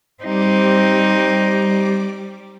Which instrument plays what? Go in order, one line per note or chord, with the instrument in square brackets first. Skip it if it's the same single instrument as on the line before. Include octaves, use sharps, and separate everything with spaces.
[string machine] G3 D6 [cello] C4 D#4